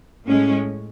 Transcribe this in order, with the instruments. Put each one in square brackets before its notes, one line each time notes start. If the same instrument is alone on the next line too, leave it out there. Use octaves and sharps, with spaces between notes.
[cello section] A2 G#3 C#4